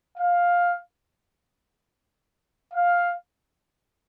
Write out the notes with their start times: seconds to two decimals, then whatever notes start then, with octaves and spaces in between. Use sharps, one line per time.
0.18 F5
2.73 F5